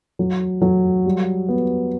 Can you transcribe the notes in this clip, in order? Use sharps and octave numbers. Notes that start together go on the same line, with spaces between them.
F#3
F#3
G3
B3